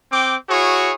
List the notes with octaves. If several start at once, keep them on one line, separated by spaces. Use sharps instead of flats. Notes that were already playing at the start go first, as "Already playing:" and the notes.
C4 G5 D6
E4 F#4 G#4 C#5